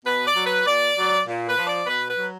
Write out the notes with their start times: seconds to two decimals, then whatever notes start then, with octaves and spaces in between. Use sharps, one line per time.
0.04 B2 B4
0.25 D5
0.35 F#3
0.45 B4
0.65 A#2 D5
0.96 F#3
1.26 A#2
1.47 B4
1.57 F3
1.67 D5
1.86 B2 B4
2.07 B4
2.17 F#3